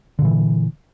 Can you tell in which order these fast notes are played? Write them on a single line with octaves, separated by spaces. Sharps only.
D3 A#2 E3